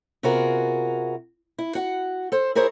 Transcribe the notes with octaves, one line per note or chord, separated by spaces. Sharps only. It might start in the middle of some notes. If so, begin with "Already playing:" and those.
C3 B3 F4 F#4 G#4 A#4
E4
F#4 F#5
A4 C5
E4 G#4 A#4 C5 C#5